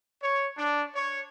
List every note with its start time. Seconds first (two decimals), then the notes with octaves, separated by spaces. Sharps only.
0.21 C#5
0.56 D4
0.94 C#5